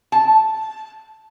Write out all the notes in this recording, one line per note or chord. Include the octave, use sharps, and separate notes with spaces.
A5